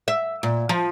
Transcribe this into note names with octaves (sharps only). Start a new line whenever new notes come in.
E5
A#2
F3